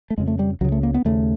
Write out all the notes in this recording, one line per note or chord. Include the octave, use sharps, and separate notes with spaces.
A3
F2 C#3 G#3
A3
G3
C#2 C#3 F#3
A3
A#3
B3
D#2 C#3 A3